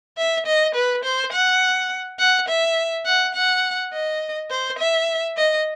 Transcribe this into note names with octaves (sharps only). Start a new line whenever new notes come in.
E5
D#5
B4
C5
F#5
F#5
E5
F#5
F#5
D#5
C5
E5
D#5